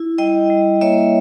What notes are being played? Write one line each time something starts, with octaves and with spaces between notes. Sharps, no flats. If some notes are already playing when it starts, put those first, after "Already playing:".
Already playing: E4
G3 D#5 G5
G3
A#3 C#5 E5